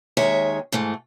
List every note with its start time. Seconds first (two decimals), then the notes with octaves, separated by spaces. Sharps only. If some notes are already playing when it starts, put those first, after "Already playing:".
0.17 D#2 D#3 G#3 C#5 E5
0.72 G#2 E3 A3